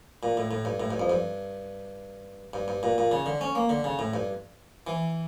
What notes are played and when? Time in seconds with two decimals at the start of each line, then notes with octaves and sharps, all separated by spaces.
0.23 A#2
0.37 A2
0.51 A2
0.65 G2
0.80 A2
0.91 G2
1.00 F2
1.10 G2
2.54 G2
2.68 G2
2.83 A#2
2.98 A#2
3.11 C#3
3.26 D3
3.41 C#4
3.55 A#3
3.69 D3
3.84 C#3
3.99 A2
4.14 G2
4.87 E3